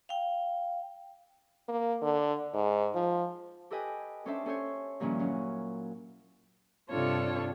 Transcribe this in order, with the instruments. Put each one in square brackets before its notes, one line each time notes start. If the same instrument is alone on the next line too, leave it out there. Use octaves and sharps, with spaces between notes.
[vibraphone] F5 G5
[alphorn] A#3
D3
G#2
F3
[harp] G4 A4 B4 D#5 G5 G#5
C#4 D4 A4 C5 E5 A5
C#4 A4 C5 C#5
G2 A#2 D#3 F3 C#4 E4
F#3 C#4
[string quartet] G2 C3 D4 F4 A4 C#5